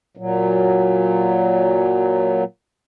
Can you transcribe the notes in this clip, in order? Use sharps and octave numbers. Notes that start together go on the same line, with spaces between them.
A#2 F#3